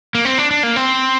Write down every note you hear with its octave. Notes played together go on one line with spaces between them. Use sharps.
A#3
C4
D4
D4
A#3
C4